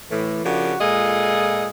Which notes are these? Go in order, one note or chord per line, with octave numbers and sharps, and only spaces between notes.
A2 E3
C#3 F3 D4 F#4 G4 A#4
A#2 G#3 F4 G#4 A4 D#5